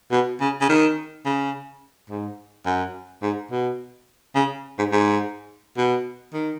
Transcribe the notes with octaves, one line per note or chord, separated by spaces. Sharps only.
B2
C#3
C#3
D#3
C#3
G#2
F#2
G#2
B2
C#3
G#2
G#2
B2
D#3